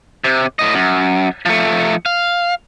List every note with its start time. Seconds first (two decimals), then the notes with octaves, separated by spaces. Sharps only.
0.24 C3
0.59 A2 D#5
0.74 F#2
1.46 F3 A3
2.06 F5